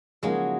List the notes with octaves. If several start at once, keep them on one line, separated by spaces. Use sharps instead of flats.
C#3 F3 F#3 G#3 A#3 D#4 F#4